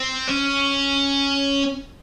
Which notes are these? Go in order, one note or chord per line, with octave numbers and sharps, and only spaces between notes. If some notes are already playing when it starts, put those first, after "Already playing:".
Already playing: C4
C#4